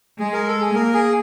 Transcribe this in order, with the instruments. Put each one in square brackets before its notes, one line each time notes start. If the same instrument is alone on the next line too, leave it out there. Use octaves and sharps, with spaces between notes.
[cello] G#3 [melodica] G#4
[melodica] A#4
A4
G#4
[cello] A#3 [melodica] A#4
[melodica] G#4